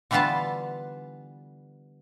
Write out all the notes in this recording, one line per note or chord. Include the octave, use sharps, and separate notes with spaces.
D3 E3 G3 B3 F4 A5